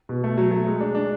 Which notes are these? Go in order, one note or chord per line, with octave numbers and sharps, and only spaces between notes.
B2
A3
F#3
A3
G#3
D4
D4